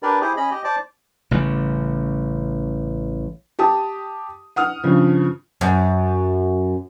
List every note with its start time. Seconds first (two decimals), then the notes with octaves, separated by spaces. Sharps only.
0.03 D4 G4 A#4 B4 D5
0.21 E4 G4 G#4 C5
0.37 C#4 D#5 B5
0.51 G4 D#5
0.64 C5 D5 A5 D6
1.31 A1 C#3 G3
3.59 G4 A5 D#6
4.56 F#5 D#6 F6
4.83 G2 C#3 F3
5.61 F#2